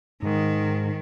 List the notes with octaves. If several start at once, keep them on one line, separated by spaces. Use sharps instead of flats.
G#2 D#3